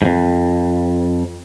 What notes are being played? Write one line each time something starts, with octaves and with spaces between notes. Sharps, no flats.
F2 G#2